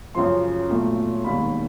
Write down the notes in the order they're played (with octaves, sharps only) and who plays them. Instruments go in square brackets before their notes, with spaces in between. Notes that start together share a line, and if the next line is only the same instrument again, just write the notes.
[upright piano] F#2 C#3 F3 C6
B1 A#2 F#3 A3
E1 D#2 D#3 B5